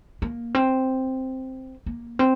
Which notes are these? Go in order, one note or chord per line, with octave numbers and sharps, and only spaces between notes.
A#3
C4
A#3
C4